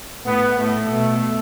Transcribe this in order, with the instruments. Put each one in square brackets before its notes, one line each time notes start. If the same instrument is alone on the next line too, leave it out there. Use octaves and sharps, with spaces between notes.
[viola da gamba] A2 [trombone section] B3
[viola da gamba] A2 [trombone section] A3
[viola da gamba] B2